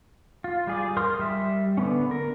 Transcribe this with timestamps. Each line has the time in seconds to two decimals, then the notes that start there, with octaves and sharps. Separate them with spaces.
0.44 F4
0.67 G3 G#4 D5
0.97 A#4 C6 D#6 F6
1.19 G3 E5
1.77 D3 B3 C#4
2.11 A#4